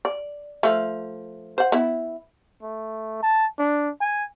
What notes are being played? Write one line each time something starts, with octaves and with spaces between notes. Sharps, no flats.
D5
F3 A3
C5 F#5
B3 E4
A3
A5
D4
G#5